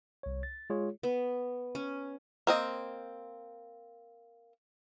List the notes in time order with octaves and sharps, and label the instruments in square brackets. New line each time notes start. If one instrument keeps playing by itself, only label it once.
[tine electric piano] C2 C#5
A6
G#3 F4 G#4 C#5
[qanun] B3
C#4
[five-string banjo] A#3 C4 D#5